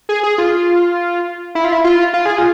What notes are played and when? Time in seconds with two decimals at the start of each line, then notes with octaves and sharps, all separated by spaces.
0.09 G#4
0.23 G#4
0.38 F4
1.55 E4
1.64 F4
1.72 E4
1.84 F4
2.14 F4
2.26 G#4
2.38 F4